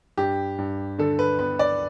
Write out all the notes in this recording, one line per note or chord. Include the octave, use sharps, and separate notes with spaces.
G2 G4
G2
D3 A4
B4
B3 B4
D5